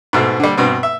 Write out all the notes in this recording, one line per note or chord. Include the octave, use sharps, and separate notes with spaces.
G#2 B2 A3
D3 G3
G2 B2 C4
E5